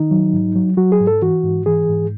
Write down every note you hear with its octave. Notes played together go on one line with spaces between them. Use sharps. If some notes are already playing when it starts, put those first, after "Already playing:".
Already playing: D#3 D#4
F#3
G#2
F#3
F#3 F#4
G#4
G#2
A4
E3 F#4
G#2
E3 G#4
G#2